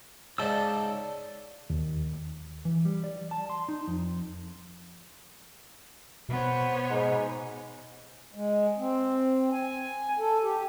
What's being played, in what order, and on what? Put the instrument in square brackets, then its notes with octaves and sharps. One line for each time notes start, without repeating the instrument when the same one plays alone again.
[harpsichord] G#2 C#3 D#4 [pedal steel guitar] D5 A5 E6
[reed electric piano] D#2
[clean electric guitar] E3
G3
D5
A5
C6
D#4
F2
[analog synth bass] B2 [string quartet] B3 C5 C#5
[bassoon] G#2
[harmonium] G#3
C4
G#5
A4
G4